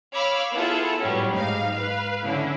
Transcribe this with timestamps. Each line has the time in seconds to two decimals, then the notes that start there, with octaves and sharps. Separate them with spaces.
0.14 C#5 F5 B5 D6 E6 F6
0.52 B3 E4 F4 G#4 A4
1.00 A2 F#3 G3 B3 C#4
1.31 G#2 D#4 F5
1.75 B4 F5
2.25 D3 C#4 E4